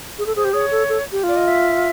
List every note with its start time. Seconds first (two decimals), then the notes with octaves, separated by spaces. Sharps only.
0.18 G#4
0.26 A4
0.36 G#4 C5
0.44 G4
0.53 G#4 C#5
0.71 A4
0.89 A4
1.12 G4
1.23 F4 D5
1.36 D#5
1.47 E5